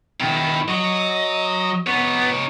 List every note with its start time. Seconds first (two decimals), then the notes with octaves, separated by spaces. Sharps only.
0.20 B2 D#3 E4
0.68 F#3 D#5
1.87 B3 D#4 C#5